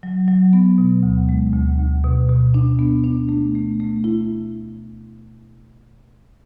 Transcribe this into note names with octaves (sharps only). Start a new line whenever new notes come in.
F#3
F#3
B3
B2
D2
G#3
D2
D2
B2
B2
D4
B3
D4
A3
A3
A3
E4